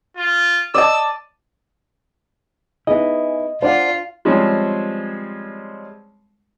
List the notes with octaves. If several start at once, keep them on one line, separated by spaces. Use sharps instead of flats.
F4
D5 D#5 A5 E6
B3 D#4 E4 G#4 D#5
D4 F4 C5 D5 F#5
F3 G3 G#3 C4 C#4